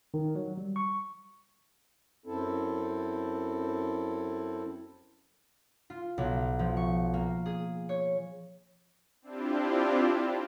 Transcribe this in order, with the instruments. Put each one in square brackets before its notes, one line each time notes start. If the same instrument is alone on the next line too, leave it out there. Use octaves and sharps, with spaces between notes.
[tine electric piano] D#3
F#3
G3
C#6
[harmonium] F#2 C4 E4 A4
[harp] F4
B1
F3
C#6
A#3
G#4
C#5
[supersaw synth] C4 D4 E4 F4 G4